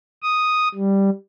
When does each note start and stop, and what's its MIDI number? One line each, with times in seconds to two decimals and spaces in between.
0.22 0.68 87
0.75 1.10 55